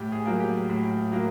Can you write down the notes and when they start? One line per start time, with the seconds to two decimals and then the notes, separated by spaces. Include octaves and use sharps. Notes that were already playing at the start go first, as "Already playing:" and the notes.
Already playing: A2 G4
0.12 G#4
0.25 F#3 A#3
0.40 G4
0.69 A2
1.12 F#3 A#3